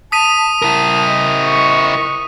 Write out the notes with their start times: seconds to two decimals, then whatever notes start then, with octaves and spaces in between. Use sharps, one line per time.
0.12 A5 D#6 B6 D#7
0.62 E4 A#4 A5
1.06 D#5
1.46 C#6